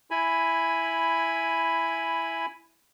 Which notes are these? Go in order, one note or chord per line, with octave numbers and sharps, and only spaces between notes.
E4 G#5 B5